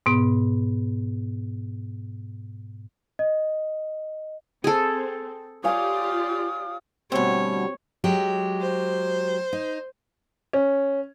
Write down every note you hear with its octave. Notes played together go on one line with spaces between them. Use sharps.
G#2 B2 B3
D#5
C4 G#4 A4
F4 G4 C#5 D5 F5 G#5 D#6
D2 B2 G3 C4 C#5
F#3 G#3 G4
C5
D#4
C#4